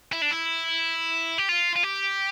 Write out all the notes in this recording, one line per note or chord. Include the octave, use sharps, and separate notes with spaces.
E4
D4
E4
G4
F4
F4
G4